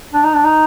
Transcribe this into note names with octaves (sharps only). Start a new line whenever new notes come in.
D4
D#4
D4
D#4